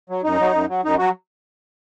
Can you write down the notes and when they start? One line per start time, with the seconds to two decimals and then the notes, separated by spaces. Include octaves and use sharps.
0.10 F#3
0.24 F#2 D#4
0.40 F#3
0.54 F#2
0.69 F#3
0.85 F#2 D#4
0.99 F#3 F#4